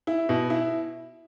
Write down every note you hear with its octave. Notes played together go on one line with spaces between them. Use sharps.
E4
B2
E4